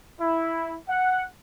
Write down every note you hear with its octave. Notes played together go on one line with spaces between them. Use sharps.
E4
F#5